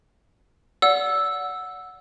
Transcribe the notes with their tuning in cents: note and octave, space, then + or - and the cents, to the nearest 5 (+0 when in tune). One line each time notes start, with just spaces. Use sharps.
D5 -30 F#5 -15 E6 +0